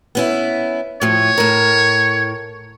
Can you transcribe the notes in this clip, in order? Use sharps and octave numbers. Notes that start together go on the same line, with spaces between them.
B3 C#4 E4
A2 F3 C#5
A2 A#4